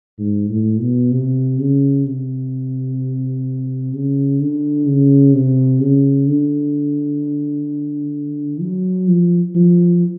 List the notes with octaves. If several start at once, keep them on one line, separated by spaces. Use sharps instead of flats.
G#2
A2
B2
C3
C#3
C3
C#3
D3
C#3
C3
C#3
D3
F#3
F3
F3